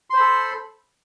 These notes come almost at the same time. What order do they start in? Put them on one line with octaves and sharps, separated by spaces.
C6 C5 B5 A4